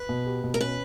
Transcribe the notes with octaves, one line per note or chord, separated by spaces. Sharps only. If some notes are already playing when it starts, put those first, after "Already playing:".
Already playing: B4
B2
G4
B2
A#4
C#4 B4